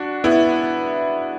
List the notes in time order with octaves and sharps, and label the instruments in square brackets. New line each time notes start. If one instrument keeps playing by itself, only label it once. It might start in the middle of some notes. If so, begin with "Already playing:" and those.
Already playing: [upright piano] D4 F#4
B3 E4